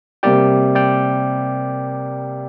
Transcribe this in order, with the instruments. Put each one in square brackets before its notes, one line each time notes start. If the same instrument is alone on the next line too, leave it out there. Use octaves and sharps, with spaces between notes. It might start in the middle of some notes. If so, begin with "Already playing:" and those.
[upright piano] C3 G3 A#3 G4 [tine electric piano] D5 G5
[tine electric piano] D5 G5